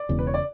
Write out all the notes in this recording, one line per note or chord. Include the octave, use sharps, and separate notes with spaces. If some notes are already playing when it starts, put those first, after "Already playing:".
Already playing: D5
E1 E2 C#3
B4
C#5
D5